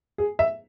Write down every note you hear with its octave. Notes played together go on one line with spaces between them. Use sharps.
G#4
E5